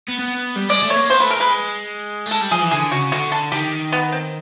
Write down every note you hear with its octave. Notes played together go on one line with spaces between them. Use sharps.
B3
B3
G3
G#3 D5
A3
C#5
A#3
B3 C5
A3 B4
A#4
G#3 B4
A3
G#3 A4
G3
F3 G#4
E3
D3 G#4
C#3 F#4
D3 F#4
A4
D#3 G4
B3
C4